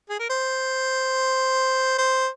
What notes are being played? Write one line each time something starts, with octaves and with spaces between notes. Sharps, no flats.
G#4
A#4
C5
C5